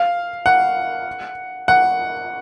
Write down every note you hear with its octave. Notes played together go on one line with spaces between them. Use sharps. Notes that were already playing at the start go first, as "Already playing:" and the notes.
Already playing: F5
F#5
F#5